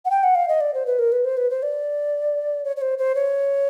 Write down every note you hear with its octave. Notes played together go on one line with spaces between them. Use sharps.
F#5
G5
F#5
F5
D#5
D5
C5
B4
A#4
B4
C5
B4
C5
D5
C#5
C#5
C5
C5
C#5